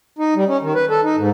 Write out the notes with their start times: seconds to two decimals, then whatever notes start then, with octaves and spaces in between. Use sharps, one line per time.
0.19 D#4
0.36 G3
0.48 C#4
0.62 D#3
0.75 B4
0.90 A4
1.03 D#4
1.17 G#2